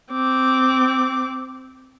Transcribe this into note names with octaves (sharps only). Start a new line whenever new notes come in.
C4 D6